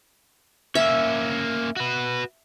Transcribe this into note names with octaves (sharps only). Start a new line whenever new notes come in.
A#3 C#4 E5
F#4 B4